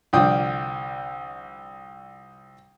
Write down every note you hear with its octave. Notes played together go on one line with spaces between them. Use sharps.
C2 D3 F3 D5 G5 D#6